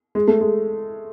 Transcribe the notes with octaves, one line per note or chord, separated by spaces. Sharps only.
G#3
A3
G#3